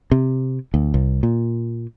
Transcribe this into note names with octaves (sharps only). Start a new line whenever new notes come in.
C3
D2
C2
A#2